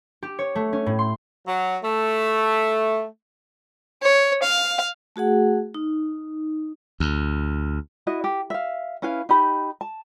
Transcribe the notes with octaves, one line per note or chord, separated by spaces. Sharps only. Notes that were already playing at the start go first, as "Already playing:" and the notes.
G4
C#5
A3
C#4
A2
C6
F#3
A3
C#5
F5
A3 F#4 G#4 F#5
D#4
D2
E4 F#4 D#5
G4
E5 F5
C#4 E4 B4 F5
D#4 G4 B5
A5